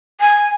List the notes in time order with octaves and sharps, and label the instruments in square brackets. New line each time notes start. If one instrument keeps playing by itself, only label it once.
[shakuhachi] G#5